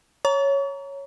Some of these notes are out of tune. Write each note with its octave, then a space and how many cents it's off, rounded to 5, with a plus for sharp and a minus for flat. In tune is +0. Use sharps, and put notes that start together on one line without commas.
C#5 +0 A#5 +0 C#6 +40